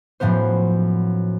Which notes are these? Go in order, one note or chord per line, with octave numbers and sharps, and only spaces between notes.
F#2 A2 F3 B3 C5